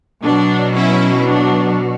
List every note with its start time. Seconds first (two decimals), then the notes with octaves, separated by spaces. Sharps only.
0.24 B2 F#3 D4
0.75 C#4 E4
1.26 D4